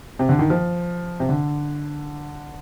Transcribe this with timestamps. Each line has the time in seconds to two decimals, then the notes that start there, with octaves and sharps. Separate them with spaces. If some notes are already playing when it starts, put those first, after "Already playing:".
0.19 C3
0.29 D3
0.39 D#3
0.50 F3
1.20 C3
1.29 D3